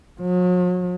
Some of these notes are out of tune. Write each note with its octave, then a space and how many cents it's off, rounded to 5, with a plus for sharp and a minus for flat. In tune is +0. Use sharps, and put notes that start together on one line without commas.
F#3 -45